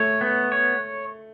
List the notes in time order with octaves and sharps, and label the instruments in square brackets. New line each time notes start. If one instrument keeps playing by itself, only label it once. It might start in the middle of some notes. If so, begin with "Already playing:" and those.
Already playing: [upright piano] A3 [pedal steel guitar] C#5
[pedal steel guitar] B3
C#5